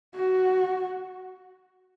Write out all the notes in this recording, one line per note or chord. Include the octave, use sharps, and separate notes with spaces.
F#4